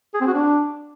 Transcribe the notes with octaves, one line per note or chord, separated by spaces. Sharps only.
G#4
C4
F#4
D4